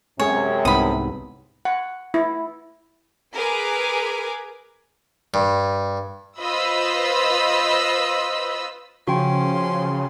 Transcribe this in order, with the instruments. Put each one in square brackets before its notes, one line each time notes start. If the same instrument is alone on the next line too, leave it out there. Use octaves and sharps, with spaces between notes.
[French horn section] F#2 C3 [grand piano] G#3 G#4 [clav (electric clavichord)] C#4 [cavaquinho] C#5
[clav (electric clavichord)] C2 G#2 B3 [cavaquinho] B5 D#6
[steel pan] F#5
E4
[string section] G#4 A#4 B4 G#5 D6
[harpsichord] G2
[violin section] F4 B4 C5 D#5 B5 E6
[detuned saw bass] C#3 [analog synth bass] F3 [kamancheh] C#4 C6 [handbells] F#4 G5